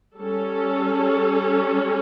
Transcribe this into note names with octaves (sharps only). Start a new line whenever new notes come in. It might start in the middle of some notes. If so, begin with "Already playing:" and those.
G3 C#4 A4